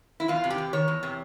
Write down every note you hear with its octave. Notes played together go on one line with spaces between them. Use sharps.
E4
E2 F4
C3
G4
E2
D#3 C#5
E2
C3